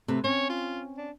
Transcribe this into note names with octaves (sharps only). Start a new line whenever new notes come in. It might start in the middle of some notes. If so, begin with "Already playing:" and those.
C3 A3 B4
C4 C#4 C#5
F4
D4